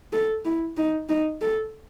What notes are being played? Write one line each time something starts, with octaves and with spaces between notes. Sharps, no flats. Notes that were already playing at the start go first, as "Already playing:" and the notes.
A4
E4
D#4
D#4
A4